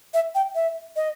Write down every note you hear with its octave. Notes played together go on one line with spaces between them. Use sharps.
E5
G5
E5
D#5